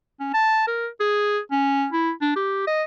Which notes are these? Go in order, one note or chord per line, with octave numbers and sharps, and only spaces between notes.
C#4
A5
A#4
G#4
C#4
E4
D4
G4
D#5